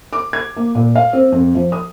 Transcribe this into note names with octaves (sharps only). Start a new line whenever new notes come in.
D6
G#6
A#3
A#2
F5
C4
F2
F3
D#6